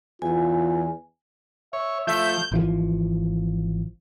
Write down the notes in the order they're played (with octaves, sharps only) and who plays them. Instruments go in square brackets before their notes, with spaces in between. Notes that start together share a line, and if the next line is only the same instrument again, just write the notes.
[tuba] E2 [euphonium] F4 [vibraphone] G#5
[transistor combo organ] C#5 [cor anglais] E5
[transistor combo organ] F3 [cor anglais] A3 [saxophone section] E5 [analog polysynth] G6
[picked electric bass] G#1 E3 F3